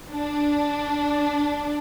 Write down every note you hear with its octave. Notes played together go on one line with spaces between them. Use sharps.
D4